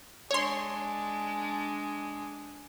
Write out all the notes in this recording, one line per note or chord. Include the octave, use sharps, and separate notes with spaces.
G#3 D4 C#5 C6